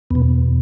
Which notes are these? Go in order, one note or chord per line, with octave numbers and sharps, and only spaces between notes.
E2 B2 B3